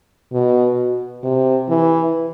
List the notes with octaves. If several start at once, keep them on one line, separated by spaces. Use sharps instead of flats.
B2
C3
E3